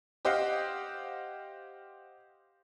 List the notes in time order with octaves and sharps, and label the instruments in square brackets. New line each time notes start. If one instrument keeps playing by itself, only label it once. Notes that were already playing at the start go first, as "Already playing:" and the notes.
[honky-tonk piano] G4 C5 D#5 F5 F#5